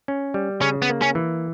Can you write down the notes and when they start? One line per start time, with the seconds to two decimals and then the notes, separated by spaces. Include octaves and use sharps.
0.08 C#4
0.34 G3
0.61 C#3 C#4
0.82 B3
0.89 A#3
1.02 C#4
1.15 E3